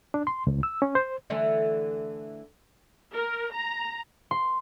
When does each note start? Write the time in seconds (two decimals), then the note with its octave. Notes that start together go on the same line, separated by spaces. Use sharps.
0.14 D4
0.27 C6
0.47 C#2
0.63 E6
0.82 C#4
0.95 C5
1.30 D3 E3 A3
3.13 A#4
3.53 A#5
4.31 C6